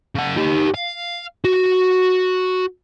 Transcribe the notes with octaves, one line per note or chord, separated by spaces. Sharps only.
C#3 F#5
D#4 G4
F5
F#4